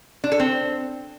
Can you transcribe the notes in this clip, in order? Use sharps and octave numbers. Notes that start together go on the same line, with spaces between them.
D4
A4
C4